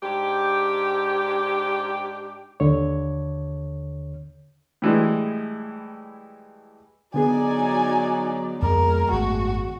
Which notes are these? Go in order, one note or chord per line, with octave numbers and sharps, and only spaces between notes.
G#2 D4 G4
D#2 D3 C#5
A2 E3 G3 G#3
D3 F#3 B3 D#4 G#4 D5 G#5
F2 G#3 A#3 A#4
G#1 F#2 A3 F#4